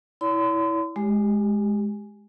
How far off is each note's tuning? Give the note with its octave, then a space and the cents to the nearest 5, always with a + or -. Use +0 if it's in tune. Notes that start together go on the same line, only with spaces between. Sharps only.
E4 -10 C#5 +45 C6 -45
G#3 +0 G4 +0